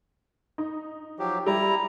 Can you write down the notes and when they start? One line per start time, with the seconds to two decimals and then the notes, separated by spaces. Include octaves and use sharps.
0.58 D#4
1.19 F3 F#3 G4
1.46 G3 E4 A#5